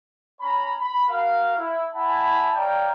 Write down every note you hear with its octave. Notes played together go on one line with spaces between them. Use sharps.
C#4 C#5 A#5 B5
B5
F#4 A#4 F5
E4
E4 F#5 G#5 A5 B5
C#5 D5 F5 G5 A#5